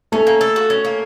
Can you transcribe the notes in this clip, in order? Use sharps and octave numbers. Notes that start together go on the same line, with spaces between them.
A3 C#4
A#3
A4
F#4
C#4
A#3